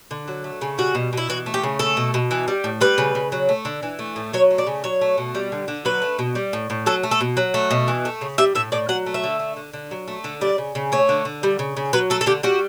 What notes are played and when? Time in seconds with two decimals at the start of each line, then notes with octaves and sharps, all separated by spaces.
0.11 D3
0.28 F#3
0.44 A3
0.61 C#3
0.78 G3 F#4
0.95 B2
1.13 B2 E4
1.29 E3 F#4
1.46 A3
1.54 G4
1.64 C#3
1.79 A3 A4
1.97 B2
2.14 B2
2.31 E3
2.48 G3
2.64 A2
2.81 G3 B4
2.98 C#3
3.15 C#3
3.32 F#3
3.49 A3
3.65 D3
3.83 E3
3.99 A3
4.16 A2
4.33 F#3 C#5
4.51 A3
4.58 D5
4.67 C#3
4.84 F#3 C#5
5.01 A3
5.18 B2
5.35 G3
5.52 D3
5.68 D3
5.85 F#3 B4
6.02 A3
6.19 B2
6.35 G3
6.53 A2
6.70 A2
6.86 F#3 A4
7.03 A3
7.11 A4
7.21 B2
7.37 F#3
7.54 A3
7.71 B2
7.88 E3
8.05 A3
8.21 C#3
8.38 G3 E5
8.55 A2 E5
8.72 A2 D5
8.89 F#3 F#5
9.06 A3
9.14 E5
9.24 D3
9.39 A3
9.57 D3
9.73 D3
9.91 F#3
10.08 A3
10.24 D3
10.41 G3 D5
10.58 C#3
10.75 C#3
10.92 A3 C#5
11.09 D3
11.25 D3
11.43 G3
11.59 C#3
11.77 C#3
11.93 F#3 B4
12.10 A3 A4
12.21 A4
12.26 D3 G4
12.43 G3 F#4